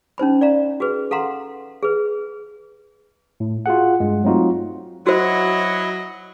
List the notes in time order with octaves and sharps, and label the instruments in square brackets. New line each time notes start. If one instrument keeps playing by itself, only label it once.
[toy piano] C#4 D#4 C5 B5
D5 F5 A#5
F#4 G#4 B4
A4 F5 F#5 A#5 C6
G#4 B4
[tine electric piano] A2
F4 F#4 G#4 F#5
G2 G#3
F#3 A3 C4 D#4 F4 F#4
[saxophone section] F#3 [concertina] E4 [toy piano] F#4 C5 [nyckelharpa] D#5 F#5